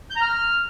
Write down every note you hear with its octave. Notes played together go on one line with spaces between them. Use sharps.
G6
A#5
F6